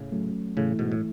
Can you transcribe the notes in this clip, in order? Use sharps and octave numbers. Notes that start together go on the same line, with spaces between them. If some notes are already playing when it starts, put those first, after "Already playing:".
Already playing: A2 C#3
F#3 A3 C#4
A2 C#3 E3 A3 E4
G#2 B2
A2